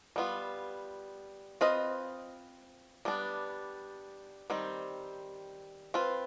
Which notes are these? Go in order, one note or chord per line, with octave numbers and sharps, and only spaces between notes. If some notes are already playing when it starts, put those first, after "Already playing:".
G3 B3 F4
C4 F4 B4 D#5
G3 B3 D4
D#3 G3 C4
C4 F4 B4